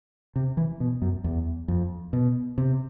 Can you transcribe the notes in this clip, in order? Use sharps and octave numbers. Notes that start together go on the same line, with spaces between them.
C3
E3
B2
F#2
E2
F2
B2
C3